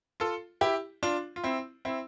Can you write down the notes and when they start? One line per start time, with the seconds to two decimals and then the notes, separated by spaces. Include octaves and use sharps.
0.20 F4 A4
0.61 E4 G4
1.03 D4 F4
1.36 F4
1.44 C4 E4
1.85 C4 E4